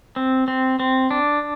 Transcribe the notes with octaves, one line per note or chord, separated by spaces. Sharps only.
C4
C4
C4
D4